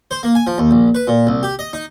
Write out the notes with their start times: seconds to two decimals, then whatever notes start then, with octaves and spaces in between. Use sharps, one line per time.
0.11 C5
0.23 A#3
0.35 G#5
0.47 F3
0.58 D#2
0.71 A#1
0.95 B4
1.07 A#2
1.27 C2
1.43 G4
1.59 D#5
1.73 D#4